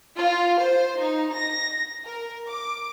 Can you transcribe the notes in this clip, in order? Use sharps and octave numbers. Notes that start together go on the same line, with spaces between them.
F4
C5
D#4
A#6
A#4
D6